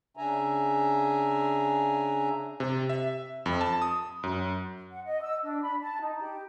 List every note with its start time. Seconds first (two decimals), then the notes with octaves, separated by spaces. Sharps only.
0.17 C#3 D4 E5 G#5 A#5
2.60 C3
2.89 E5
3.46 F2
3.61 A5
3.82 D#6
4.23 F#2
4.91 F#5
5.05 D#5
5.22 E6
5.43 D4
5.62 B5
5.81 A5
6.01 D#4
6.21 G4